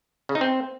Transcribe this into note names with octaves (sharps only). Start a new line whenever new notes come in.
C#3
D#4
C4